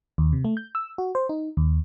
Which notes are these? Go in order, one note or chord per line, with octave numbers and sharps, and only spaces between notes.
D#2
C3
A3
G6
E6
F#4
C5
D#4
D#2